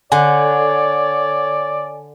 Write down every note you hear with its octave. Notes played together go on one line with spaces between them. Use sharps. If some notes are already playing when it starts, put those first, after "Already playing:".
D3 C#5 D5 G#5